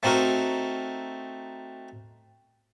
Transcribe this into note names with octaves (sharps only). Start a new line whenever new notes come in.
A3 C4 D#4 F#4 A#4